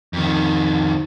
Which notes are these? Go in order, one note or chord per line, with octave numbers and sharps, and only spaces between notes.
F2 D#3